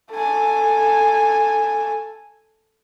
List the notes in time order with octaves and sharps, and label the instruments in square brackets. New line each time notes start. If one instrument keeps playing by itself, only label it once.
[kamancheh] A4 G#5